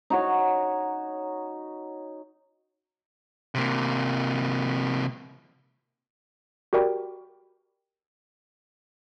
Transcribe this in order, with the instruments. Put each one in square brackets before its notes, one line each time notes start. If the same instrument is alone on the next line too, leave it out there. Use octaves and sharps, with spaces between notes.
[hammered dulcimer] D#4 F#4 C#5
[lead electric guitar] C3 A#3
[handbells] F#4 G4 A#4 D5 G5 B5